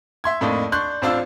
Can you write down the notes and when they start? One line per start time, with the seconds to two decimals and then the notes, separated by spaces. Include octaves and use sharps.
0.24 E5 C6 G#6
0.41 F2 A2 A#3 D4 D#4
0.72 D4 C6 C#6 F#6 G6
1.02 A1 C4 D4 F4 E6